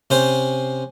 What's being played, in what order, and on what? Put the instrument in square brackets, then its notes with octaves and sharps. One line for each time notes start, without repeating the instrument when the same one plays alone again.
[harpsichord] C3 C#4 C5